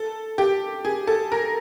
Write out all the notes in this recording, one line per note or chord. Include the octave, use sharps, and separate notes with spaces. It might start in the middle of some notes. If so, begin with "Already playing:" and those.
Already playing: A4
G4
G#4
A4
A#4